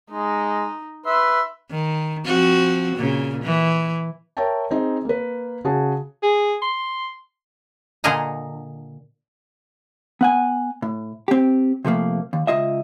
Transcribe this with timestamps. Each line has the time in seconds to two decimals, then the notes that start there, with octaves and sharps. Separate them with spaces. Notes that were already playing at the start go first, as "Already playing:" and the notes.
0.10 G#3 D#4
1.06 B4 E5 C6
1.70 D#3
2.25 F3 C4 F#4
2.96 A#2 C#3
3.44 E3
4.37 A#4 C#5 E5 G5 A5
4.71 C4 D#4 G#4
5.05 A#3 B4
5.64 C#3 F#4 G#4 A5
6.23 G#4
6.62 C6
8.04 A#2 D3 G#4 D#5 F5 A#5
10.21 B3 F#5 G#5
10.82 A2
11.28 C4 G4
11.85 C3 F3 A3 A#3
12.33 D#2
12.47 C#2 F4 D#5 E5